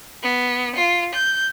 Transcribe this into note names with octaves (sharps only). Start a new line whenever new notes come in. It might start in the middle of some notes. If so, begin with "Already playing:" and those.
B3
F4
G6